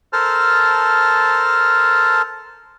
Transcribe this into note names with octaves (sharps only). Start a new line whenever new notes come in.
A4 A#4 C5 A5 F6